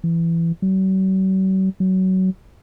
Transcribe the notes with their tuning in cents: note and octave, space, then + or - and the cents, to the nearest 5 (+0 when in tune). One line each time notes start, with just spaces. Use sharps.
E3 +20
F#3 +45
F#3 +20